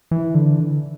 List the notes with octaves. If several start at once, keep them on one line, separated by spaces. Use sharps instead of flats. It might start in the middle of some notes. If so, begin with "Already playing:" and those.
E3
D3